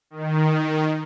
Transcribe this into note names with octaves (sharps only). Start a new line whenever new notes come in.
D#3